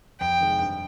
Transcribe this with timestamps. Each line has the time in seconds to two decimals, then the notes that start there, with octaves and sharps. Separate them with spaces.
0.20 F2 G5
0.40 C3 D#3 G#3
0.60 G2